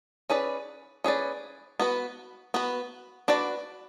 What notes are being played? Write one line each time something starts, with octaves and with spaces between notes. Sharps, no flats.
C#4 G#4 B4 D5
C#4 G#4 B4 D5
B3 F#4 B4
B3 F#4 B4
D4 F#4 B4 D5